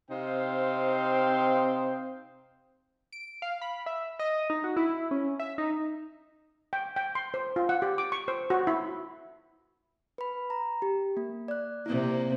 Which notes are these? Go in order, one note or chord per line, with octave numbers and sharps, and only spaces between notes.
C3 C4 D#4 C5 F5 G5
D7
F5
B5
E5
D#5
D#4
F#4
E4
C#4
E5
D#4
G5
G5
C6
C5
F4
F#5
G4
D6
C#6
C5
F#4
E4
B4 B5
A#5
G4
A#3
D5 F#6
C3 A#3 E4